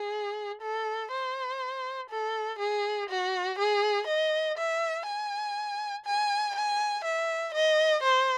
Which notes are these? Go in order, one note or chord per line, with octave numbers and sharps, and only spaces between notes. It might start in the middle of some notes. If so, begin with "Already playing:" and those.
Already playing: G#4
A4
C5
A4
G#4
F#4
G#4
D#5
E5
G#5
G#5
G#5
E5
D#5
C5